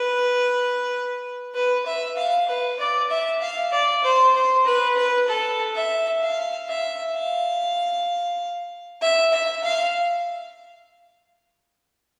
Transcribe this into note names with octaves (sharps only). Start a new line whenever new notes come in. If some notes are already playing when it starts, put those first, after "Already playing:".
Already playing: B4
B4
E5
F5
B4
D5
E5
F5
D5
C5
C5
B4
B4
A4
E5
F5
E5
F5
E5
E5
F5